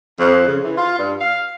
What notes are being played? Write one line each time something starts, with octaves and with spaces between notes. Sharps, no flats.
F2
C#3
E3
F4
G2
F5